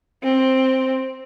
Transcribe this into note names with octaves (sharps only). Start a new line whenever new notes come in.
C4